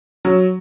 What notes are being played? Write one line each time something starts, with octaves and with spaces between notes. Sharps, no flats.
F#3